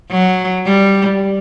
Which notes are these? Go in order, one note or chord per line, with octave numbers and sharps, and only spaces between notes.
F#3
G3